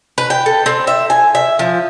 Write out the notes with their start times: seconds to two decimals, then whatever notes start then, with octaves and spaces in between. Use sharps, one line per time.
0.18 B4
0.30 G5
0.46 A4
0.66 C4
0.87 E5
1.10 G#5
1.35 E5
1.59 F3